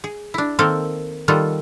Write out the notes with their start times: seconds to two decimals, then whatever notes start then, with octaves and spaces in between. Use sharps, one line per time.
0.04 G#4
0.34 D4 E4
0.59 D#3 A#3 C4 A4 A#4
1.28 D#3 G3 F4 A4 F#5